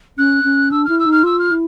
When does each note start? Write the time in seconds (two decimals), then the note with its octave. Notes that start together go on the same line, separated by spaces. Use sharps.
0.18 C#4 F#6
0.44 C#4
0.71 D4 E6
0.84 E4 F6
0.99 E6
1.06 D#4
1.11 F6
1.23 F4 E6
1.39 F6
1.51 E4